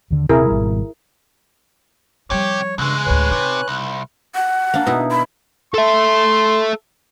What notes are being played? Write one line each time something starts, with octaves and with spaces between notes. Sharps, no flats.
D#2 D3
D#1 C3 C4 E4 G#4 A#4
G#1 B2 G3
C3 F3 G3 G4 C#5
E2 G2 C#3 G#3 C#6 E6 F#6
D2 A2 B4 C#5 G#5
C3 D#4
C2
F#5
A#3 D4
B2 D#4 E4
B5
A4 E5 C6